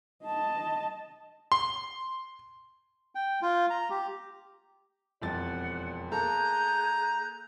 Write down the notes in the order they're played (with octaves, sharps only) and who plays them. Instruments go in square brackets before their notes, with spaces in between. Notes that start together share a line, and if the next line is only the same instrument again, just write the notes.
[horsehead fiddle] D#5 A5
[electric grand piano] C6
[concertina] G5
F4
A#5
G4
[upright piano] E1 F2 A6 [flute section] D5 F#5
[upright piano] A#3 A4 [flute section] G#4 F#6 G6 [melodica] A#5